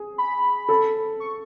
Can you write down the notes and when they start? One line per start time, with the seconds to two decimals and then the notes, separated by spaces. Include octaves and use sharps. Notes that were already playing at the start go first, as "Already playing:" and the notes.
Already playing: G#4
0.18 B5
0.69 A4
1.20 C#6